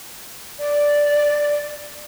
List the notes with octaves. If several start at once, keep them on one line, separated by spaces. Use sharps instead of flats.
D5